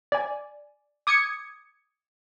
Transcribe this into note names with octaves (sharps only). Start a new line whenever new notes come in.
D5 G#5
D6 D#6 G#6 C#7